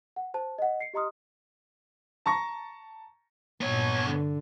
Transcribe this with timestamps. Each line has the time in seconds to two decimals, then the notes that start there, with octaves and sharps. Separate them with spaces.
0.16 F#5
0.34 C5 A5
0.58 D#5 F#5
0.81 C7 C#7
0.94 G4 D#5 A#5 C6 D#6 F6
2.26 A5 A#5 C#6 A#6
3.61 G2 A#2 B3 C#5
4.07 D3